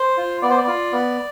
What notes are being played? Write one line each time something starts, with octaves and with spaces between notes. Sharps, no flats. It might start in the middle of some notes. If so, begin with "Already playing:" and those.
Already playing: C5
F4
B3 D5
C5
D5
F4
B3